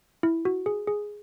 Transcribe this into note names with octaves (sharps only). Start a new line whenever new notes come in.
E4
F#4
G#4
G#4